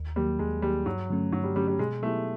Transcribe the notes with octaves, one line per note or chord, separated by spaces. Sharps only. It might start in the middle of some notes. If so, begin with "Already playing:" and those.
Already playing: D#2
D#3 F#3 G3 A#3
D#2 G#3
D#3 F#3 G3 A#3
G2 F#3
D3 F#3 A3 C#4
G2 F#3
G3
D3 F#3 G3 A3 C#4
G3
B2 G#3
F#3 A3 B3 E4 G4